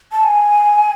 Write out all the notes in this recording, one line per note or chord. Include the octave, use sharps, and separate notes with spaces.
A5
G#5